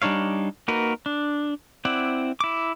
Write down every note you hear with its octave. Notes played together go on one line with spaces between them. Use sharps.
G3 D4 D#4 C#5 F5
A#3 D#4 F#4 A#4 B4
D4
C4 E4 D5 F#5
E4 D6